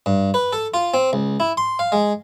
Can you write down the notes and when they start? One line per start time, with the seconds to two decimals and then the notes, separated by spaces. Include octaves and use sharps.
0.06 G2
0.34 B4
0.53 A4
0.74 F4
0.94 C4
1.13 C#2
1.40 E4
1.57 C6
1.79 F5
1.92 G#3